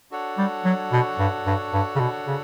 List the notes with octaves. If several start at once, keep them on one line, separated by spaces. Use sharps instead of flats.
D4 F#4 A4 C#5 F#5
G3
F#3
B2
G2
G2
G2
C#3
B2
C#3